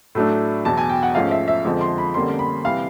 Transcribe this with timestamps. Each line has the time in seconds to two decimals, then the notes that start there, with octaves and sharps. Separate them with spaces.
0.15 A2 F#3 A3 D4
0.65 E2 B2 F#3 A5
0.77 G#5
0.89 G5
1.03 F#5
1.15 G#2 F3 A3 C#4 F5
1.31 E5
1.48 E5
1.65 F2 D3 F3 G#3
1.81 C6
1.98 B5
2.14 F2 D3 G3 A#3 C#4 C6
2.39 B5
2.64 C3 E3 G3 F5